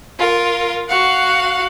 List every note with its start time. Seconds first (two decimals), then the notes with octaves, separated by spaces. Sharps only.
0.19 F4 A#4
0.87 F#4 F5 F#5